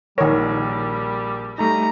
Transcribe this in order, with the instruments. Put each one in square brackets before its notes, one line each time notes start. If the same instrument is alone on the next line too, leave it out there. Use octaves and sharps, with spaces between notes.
[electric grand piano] A#1 A#4 [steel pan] D#3 C#5 [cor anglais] G3
[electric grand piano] G3 A3 D#4 [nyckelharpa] A#5